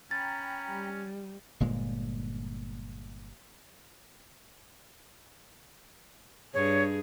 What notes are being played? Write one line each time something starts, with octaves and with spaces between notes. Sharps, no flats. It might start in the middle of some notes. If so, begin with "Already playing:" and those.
C#4 G5 A#5 B5 A6
G3
G1 A#2 G#3
G2 G#4 C#5